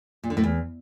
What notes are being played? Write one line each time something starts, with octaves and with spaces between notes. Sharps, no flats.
A#2
D3
A2
E2